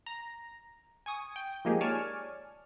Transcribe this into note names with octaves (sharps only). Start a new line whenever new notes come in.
A#5
G#5 C#6 D#6
G5
F3 G#3 A#3 D#4 G4 G#4
C#5 D5 G#5 A5 C#6 F6